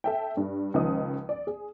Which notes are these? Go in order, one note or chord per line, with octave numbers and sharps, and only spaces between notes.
A4 E5 G5
G2
C#2 D#3 F3 D#5 D#6
D5
G#4